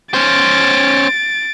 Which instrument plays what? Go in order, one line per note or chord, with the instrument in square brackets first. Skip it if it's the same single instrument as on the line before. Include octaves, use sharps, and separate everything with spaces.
[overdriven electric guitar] C#4 C5 [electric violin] A6 D7